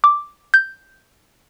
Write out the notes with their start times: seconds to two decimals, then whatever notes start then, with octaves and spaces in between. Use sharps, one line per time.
0.04 D6
0.54 G6